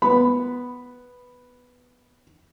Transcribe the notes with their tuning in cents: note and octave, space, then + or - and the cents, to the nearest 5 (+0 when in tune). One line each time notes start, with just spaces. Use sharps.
B3 +0 B5 +0